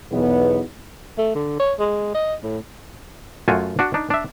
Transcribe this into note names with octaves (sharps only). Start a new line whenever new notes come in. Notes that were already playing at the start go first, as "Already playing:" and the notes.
B1 E2 B3
A3
D3
C#5
G#3
D#5
A2
F#2 A3 F4 F#4 G#5
D4 F#4
D4 D#4
D4 E5